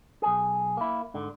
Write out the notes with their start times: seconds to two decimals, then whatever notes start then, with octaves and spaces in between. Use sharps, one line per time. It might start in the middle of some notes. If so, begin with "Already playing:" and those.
0.22 B1 G#4
0.77 A#3 E4
1.14 G#2 D3